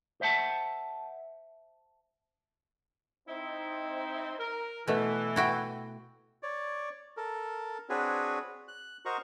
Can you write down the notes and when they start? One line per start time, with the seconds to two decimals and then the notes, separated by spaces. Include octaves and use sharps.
0.21 C5 E5 F#5 A5
3.28 C4 D#4 E4
4.39 A#4
4.88 B2 E3 A3
5.36 E4 F#4 G5
6.43 C#5 D5
7.17 A4 A#4
7.89 C4 D4 F#4 G#4 B4 C#5
8.68 F#6
9.05 F#4 A#4 C5 D#5 A#5 C#6